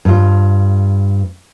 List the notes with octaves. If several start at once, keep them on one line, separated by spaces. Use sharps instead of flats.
G2 F4